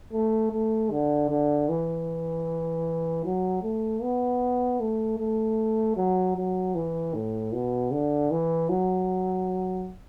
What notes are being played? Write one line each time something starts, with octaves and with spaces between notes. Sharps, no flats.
A3
A3
D3
D3
E3
F#3
A3
B3
A3
A3
F#3
F#3
E3
A2
B2
D3
E3
F#3